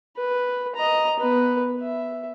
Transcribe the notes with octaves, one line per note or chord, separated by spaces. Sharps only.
B4
D#5 A#5
B3 B4
E5